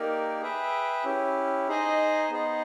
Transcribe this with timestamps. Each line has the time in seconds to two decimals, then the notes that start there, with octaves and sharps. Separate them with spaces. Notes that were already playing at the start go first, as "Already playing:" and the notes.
Already playing: A#3 D#4 G4 A#4 D5
0.42 G#4 B4 E5 G5
1.05 C#4 E4 G4
1.68 D#4 G#4 C5 D#5 G#5
2.31 B3 D#4 G#4 C5 D#5